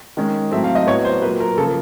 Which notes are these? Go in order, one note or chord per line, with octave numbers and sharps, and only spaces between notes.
D#3 G#3 C#4
A2 F#3 A3 C4 E5
F5
D#5
A2 F#3 B3 C#5
C5
A#2 F#3 A#3 B4
A#4
C#3 F3 A#3 A4